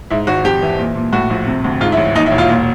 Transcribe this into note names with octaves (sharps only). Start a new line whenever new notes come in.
G#2 E4
G#1 F#4
F2 G4
E3
A#2
A#2
A2 F#4
A#1
C3
D2
G#2 F4
E4
A1
D#2 D#4
E4
E1
F4
A#2